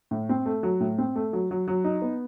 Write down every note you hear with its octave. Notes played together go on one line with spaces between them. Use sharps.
A2
C4
A3
F#3
A2
C4
A3
F#3
F#3
F#3
D#4
B3